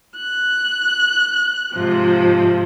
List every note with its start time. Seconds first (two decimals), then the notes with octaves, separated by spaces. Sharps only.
0.15 F#6
1.72 G#2 C3 F3